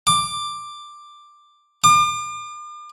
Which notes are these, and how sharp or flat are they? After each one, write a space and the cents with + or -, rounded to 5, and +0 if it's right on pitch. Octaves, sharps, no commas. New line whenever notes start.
D6 +10
D6 +40